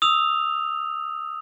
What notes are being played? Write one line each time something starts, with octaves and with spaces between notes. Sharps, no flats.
D#6 E6 F7